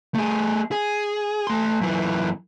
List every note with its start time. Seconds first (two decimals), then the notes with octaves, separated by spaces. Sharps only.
0.15 A3 G#4
0.72 G#4
1.47 A3 C6
1.81 F#2 E3